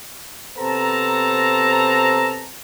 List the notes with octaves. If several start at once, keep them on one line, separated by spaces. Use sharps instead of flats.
C3 B3 A4 C5 A5 A#5